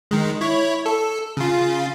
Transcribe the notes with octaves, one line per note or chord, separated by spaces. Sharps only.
D#3 G#3
E4 C#5
A4
C#3 F4